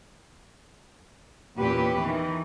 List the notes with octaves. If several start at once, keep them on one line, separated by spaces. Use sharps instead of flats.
E2 A#2 C#4 G4 B4
D#3 E3